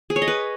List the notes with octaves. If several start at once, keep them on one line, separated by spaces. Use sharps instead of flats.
G#4
C#5
D#5
B4